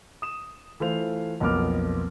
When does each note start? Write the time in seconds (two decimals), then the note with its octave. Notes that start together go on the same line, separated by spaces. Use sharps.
0.22 D#6 E7
0.80 E3 A3 F4 C5 F7
1.40 B1 F2 A#3 B3 D6 F6